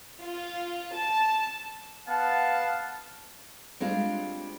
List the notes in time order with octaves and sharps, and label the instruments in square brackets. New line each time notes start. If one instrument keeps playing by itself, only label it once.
[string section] F4
A5
[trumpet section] B3 F#5 A5 [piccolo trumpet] F5
[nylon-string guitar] G3 G#3 C4 D4 F4